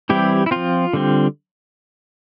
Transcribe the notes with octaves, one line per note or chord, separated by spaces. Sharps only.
E3 G3 C4 E4 G4
E4
F3 C4 F4
D3 G3 C4